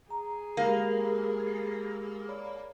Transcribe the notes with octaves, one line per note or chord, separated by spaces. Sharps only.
G#4 A#5
G#3 A#3 G4 B5
C#5 D5 B5